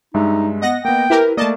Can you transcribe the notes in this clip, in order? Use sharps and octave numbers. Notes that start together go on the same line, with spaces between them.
G2 G#3 D#4 E5
B3 D#5 F#5 A#6
A#3 B3 G5
E4 G4 A#4 B4
A3 A#3 D5 D#5 A5